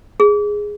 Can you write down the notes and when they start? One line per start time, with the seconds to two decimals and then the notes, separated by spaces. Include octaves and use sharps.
0.20 G#4